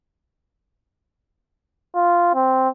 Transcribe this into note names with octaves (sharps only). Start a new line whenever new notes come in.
F4
C4